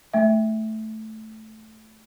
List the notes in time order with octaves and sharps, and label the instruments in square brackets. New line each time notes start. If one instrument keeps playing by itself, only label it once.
[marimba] A3 E5